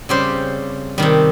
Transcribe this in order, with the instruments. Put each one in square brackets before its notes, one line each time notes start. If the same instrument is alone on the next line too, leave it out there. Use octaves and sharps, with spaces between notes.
[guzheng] C#3 G3 C4 G4 C5
C3 D#3 G3